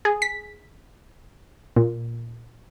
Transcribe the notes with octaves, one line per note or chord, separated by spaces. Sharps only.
G#4
B6
A#2